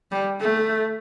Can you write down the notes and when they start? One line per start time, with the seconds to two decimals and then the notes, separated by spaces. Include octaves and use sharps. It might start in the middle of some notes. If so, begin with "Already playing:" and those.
0.12 G3
0.41 A3